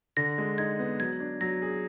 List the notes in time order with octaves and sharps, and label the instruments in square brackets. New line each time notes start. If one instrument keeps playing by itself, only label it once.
[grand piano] D3 [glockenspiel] A#6
[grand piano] G#3
[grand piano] D#4 [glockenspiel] G#6
[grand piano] B3
[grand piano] F#3 [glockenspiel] G#6
[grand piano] D4
[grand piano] F#3 [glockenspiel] A#6
[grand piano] G#4